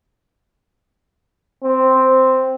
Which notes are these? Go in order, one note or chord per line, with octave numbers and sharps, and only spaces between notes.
C4